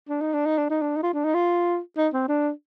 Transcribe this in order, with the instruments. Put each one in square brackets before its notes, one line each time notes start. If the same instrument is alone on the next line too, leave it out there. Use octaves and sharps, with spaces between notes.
[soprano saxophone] D4
D#4
D4
D#4
D4
D#4
D4
D#4
F4
D4
D#4
F4
D#4
C4
D4